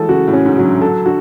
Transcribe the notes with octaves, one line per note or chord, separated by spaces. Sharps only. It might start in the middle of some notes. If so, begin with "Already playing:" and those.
Already playing: E3 F#3 G#3 A3 A4
C#3 F#4
A2
C#4
G#2
F#3
D3
A4
D3 F#4